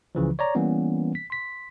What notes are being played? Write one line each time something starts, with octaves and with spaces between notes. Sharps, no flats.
C#2 C#3 E3 F3
C#5 D5 A#5
E3 G3 A#3 B3 C#4
B6
C6 B6